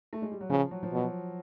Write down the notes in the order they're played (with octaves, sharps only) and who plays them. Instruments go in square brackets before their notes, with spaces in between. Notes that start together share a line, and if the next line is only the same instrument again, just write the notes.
[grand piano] A3
G#3
G3
F#3
[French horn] C#3 [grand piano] F3
[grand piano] F#3
F3
[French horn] B2 [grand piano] F#3